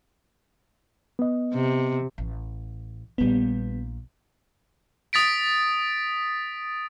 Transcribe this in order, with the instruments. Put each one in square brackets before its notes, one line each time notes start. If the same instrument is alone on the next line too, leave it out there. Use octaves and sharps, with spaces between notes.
[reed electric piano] B3 D#5
[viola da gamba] C3
[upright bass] A1
[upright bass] A#1 A#2 [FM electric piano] G3 B3
[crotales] D#6 A6 B6 D7